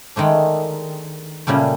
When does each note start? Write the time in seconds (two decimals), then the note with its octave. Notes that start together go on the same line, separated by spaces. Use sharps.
0.16 D#3 G#3 A3 D4
1.47 A#2 C#3 G3 A3